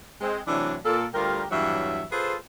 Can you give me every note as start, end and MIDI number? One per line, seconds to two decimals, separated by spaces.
0.21 0.40 56
0.21 0.40 60
0.47 0.77 48
0.47 0.77 52
0.47 0.77 54
0.47 0.77 57
0.47 0.77 62
0.85 1.04 46
0.85 1.04 69
1.13 1.43 38
1.13 1.43 55
1.13 1.43 65
1.13 1.43 67
1.13 1.43 70
1.51 2.04 40
1.51 2.04 43
1.51 2.04 52
1.51 2.04 54
1.51 2.04 73
1.51 2.04 76
2.12 2.35 65
2.12 2.35 68
2.12 2.35 69
2.12 2.35 71
2.12 2.35 72